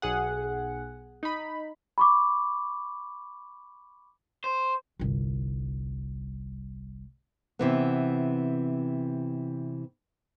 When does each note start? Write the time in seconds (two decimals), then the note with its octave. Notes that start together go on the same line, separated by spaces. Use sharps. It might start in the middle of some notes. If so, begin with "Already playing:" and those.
0.02 B1 G#4 F#5
1.23 D#4 B5
1.98 B5 C#6 D6
4.44 C5
4.99 G1 C2
7.59 C3 E3 B3